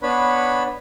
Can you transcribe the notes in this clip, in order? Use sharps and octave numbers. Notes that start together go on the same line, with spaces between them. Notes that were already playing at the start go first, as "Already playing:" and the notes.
B3 D4 B4 C#5 B5